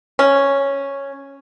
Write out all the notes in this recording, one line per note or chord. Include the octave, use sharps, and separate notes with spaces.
C#4